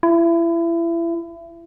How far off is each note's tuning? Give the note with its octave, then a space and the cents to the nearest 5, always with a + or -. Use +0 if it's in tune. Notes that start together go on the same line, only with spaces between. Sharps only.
E4 +30